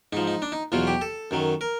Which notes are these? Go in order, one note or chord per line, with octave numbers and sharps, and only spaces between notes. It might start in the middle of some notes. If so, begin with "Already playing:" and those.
G#2 F3 D#4
D#4
D4
D#4
E2 B2 F#3 F4
G4
A4
F#2 D#3 F#3
A#4